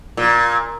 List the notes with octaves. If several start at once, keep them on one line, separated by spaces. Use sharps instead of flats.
A#2